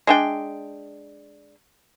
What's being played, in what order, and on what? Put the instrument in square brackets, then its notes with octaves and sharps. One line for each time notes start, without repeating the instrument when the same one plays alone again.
[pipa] G#3 D4 G5